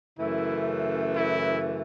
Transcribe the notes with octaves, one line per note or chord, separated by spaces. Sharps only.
F#2 C#3 E3 A3 E4
E4